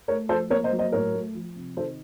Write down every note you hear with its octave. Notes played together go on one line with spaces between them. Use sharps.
A3 A#4 C#5
F3 A4 C5
A#3 A#4 C#5
C5 D#5
F#3
C5 D#5
A2 A#4 C#5
A3
F3
C3
D#3 A4 C5